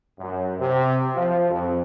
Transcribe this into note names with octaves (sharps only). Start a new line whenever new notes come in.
F#2
C3
F3
F2